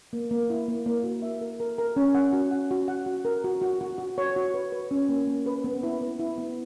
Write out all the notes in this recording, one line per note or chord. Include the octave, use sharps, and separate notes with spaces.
A#3
A#3
E4
A#3
A#3
F#4
E5
A#4
A#4
A#4
C#4
F#5
F#4
F#5
F#4
F#5
F#4
A#4
F#4
F#4
F#4
F#4
C#5
F#4
B4
B4
C#4
A#3
A#3
B4
B3
E4
B4
E4
B3